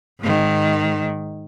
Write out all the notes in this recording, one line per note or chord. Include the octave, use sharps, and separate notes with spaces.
G#2 D#3